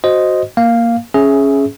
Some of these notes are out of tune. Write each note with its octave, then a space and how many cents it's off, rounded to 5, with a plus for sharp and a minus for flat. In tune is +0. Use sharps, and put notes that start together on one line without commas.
F#4 +0 C5 +0 D#5 +0
A#3 +0 F5 +0
C#4 +0 G#4 +10 E5 +0